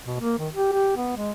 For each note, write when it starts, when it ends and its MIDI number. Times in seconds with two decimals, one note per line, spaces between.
0.07 0.18 47
0.20 0.36 58
0.38 0.49 51
0.55 0.72 67
0.72 0.93 67
0.97 1.14 59
1.17 1.31 56